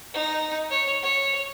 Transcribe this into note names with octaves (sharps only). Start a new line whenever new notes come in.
D#4
C#5
C#5